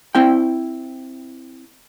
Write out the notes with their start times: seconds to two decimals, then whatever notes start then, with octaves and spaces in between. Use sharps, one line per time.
0.15 C4 E4 G5